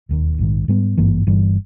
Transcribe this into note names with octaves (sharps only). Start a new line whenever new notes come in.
E1 D#2 D#3
A#1 G#2 D#3
G#2 G3 B3
G#1 G2 E3 A#3
G1 G2 E3 G3